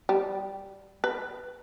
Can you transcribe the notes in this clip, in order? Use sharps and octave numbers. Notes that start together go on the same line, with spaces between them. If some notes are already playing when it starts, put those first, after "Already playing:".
G3
B4